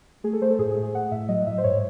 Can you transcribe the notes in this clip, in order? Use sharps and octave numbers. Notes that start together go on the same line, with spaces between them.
A3 G#4
A4
A3 C5
A4
A2 G#4
G#4
A3
G#4
A3 F#5
A2 E5
F#3 D#5
A2 E5
C5
G#2 C#5